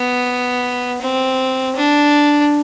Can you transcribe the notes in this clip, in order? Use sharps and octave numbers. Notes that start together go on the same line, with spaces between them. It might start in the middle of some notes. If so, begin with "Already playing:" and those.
Already playing: B3
C4
D4